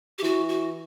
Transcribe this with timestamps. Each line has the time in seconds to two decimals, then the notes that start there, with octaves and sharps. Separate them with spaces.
0.18 G4
0.22 E3 F#4
0.49 F#4